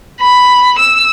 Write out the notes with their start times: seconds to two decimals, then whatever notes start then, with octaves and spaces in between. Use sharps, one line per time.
0.21 B5
0.78 E6